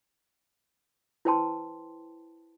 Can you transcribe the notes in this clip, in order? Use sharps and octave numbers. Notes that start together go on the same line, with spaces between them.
E4 B4 C5 G5 A5 C6